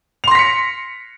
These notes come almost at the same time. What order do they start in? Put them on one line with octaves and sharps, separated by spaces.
F7 C6 A#6 B6 C#7